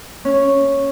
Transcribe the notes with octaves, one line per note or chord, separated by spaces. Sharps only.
C#4